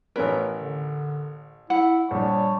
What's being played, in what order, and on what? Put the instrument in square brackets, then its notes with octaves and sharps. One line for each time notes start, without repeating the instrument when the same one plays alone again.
[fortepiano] A1 C#4 B4 [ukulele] A#4
[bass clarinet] D3
[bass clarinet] E4 [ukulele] F#5
[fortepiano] A#1 [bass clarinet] G3 [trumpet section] C#5 D5 A5